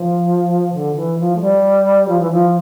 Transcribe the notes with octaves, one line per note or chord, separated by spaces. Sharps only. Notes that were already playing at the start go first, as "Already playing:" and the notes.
Already playing: F3
D3
E3
F3
A3
G3
F3
E3
F3